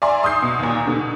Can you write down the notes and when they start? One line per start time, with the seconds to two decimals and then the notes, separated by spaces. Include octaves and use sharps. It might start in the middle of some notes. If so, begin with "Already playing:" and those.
0.02 D5 E5 G#5 A#5 C6
0.23 C6 D#6 E6 G6 C7
0.42 B2
0.59 D#2 A#2
0.87 B2 D3